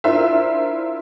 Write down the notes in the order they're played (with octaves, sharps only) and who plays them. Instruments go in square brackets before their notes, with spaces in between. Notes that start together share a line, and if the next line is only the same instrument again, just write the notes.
[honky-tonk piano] D4 E4 F4 A#4 C5 E5